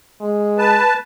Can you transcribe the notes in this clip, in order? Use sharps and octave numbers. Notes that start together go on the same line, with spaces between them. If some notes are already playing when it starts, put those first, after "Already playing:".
G#3
B4 A5